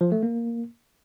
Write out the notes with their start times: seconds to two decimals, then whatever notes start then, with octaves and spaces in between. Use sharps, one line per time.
0.01 F3
0.12 A3
0.23 A#3